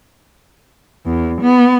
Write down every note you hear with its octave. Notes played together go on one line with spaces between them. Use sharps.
E2
B3